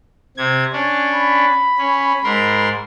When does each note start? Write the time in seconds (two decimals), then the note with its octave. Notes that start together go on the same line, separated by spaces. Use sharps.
0.37 C3 G#6
0.73 C#4 D4
1.14 B5
1.78 C#4
2.24 G#2 A#4 C6